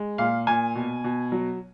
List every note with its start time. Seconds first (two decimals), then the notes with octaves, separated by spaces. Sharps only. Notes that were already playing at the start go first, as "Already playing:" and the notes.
Already playing: G#3
0.18 A#2 F5
0.47 A#2 G#5
0.75 B2
1.04 B2
1.32 F#3